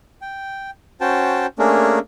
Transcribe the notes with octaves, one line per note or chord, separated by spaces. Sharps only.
G5
C#4 F#4 C5 G5 A5
A3 A#3 C#4 D4 G#4 A#4